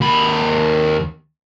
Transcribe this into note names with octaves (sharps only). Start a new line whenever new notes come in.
D#2 B5